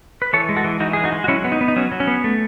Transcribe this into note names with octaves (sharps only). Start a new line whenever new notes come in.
B4
E3 A4 C#5
G#3
F#4 A4
E3
E3 D#4 F#4
G#3 G#4
D#4 F#4
G#3
F#4
F#3 C#4 E4
B3
D#4
B3
D#4
F#3 C#4
F#3
C#4
B3
A3